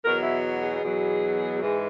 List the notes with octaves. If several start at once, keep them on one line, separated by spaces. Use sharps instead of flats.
E2 B2 F#3 A#4
E4
G#4
E2 B2 F#3
G#2 E3 G#3